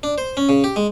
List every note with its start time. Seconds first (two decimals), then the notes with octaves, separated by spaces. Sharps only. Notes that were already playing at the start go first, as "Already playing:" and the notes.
0.03 D4
0.18 C5
0.37 C#4
0.49 C#3
0.64 G4
0.76 G#3